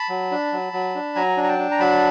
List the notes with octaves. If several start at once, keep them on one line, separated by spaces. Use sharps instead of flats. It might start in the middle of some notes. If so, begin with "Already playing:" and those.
Already playing: A5 B5
F#3
D4
F#3
F#3
D4
F#3 G#5 A#5
D4
A#5
G5 A5
D4
A#5
F#3 A5 B5